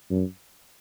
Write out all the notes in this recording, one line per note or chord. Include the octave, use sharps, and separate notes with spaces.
F#2